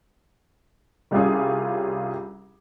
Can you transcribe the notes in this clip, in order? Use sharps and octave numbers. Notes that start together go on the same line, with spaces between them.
C2 G3 C#4 F4 G#4